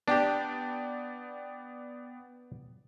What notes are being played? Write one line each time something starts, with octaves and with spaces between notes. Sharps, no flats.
B3 D4 G4 D5 G5